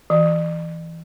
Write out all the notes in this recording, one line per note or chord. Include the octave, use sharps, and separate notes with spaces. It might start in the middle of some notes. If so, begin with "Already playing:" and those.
E3